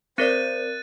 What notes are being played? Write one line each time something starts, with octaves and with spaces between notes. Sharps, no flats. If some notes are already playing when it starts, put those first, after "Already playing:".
C4 A#4 C5 D5 F#6 A6 D#7